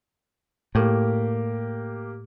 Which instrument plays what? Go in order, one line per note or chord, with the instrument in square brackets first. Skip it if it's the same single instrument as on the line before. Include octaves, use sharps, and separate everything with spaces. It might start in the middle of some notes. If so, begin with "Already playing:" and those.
[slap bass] A2 [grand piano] A#3 G4